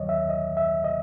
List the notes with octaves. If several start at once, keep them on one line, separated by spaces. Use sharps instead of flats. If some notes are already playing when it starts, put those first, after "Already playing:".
Already playing: D#2 D#3 F#3 C#5 D#5
E5
D#5
E5
D#5